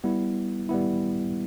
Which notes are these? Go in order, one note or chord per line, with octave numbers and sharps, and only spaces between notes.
G3 B3 E4
G3 B3 E4